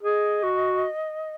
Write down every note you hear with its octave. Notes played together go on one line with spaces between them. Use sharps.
G#4 D#5
F#4